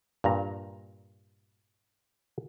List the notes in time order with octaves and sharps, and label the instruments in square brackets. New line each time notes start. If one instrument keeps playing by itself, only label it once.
[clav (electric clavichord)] G2 A#2 A#5